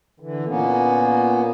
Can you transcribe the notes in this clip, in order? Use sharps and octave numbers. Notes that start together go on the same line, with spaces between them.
D3 E3
A#2 A#3 B3 C#4